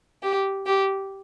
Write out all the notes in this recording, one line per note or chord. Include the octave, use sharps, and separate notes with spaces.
G4
G4